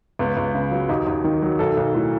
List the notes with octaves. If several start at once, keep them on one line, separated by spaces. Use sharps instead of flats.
C#2 B3
C#2
C#3
F#3
D#2 D#4
D#2
D#3
F#3
B1 A4
B1
A2